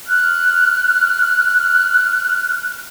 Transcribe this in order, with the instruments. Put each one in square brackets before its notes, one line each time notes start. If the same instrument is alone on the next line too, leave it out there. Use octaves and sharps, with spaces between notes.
[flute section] F6 F#6